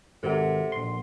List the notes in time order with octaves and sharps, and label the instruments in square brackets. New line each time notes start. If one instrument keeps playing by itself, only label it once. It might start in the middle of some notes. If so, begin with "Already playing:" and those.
[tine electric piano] G#1 [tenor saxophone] C3 [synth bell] A4 F#5
[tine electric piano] A#1 C6